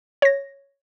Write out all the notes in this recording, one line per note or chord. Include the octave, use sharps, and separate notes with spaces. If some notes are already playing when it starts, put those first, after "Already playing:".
C#5 A#6